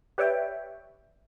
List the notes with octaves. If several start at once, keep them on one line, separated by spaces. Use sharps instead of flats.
G4 B4 C#5 D5 E5 G5